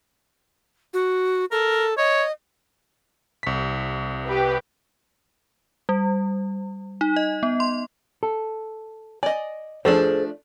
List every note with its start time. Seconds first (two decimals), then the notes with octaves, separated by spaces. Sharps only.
0.94 F#4
1.52 A4 A#4
1.98 C#5 D#5
3.43 C2 B6
4.27 G4 B4
5.89 G3
7.01 D#4
7.16 D#5
7.43 B3
7.60 C6
8.23 A4
9.23 D5 D#5 G#5
9.85 F3 A3 D4 G#4 A4 C5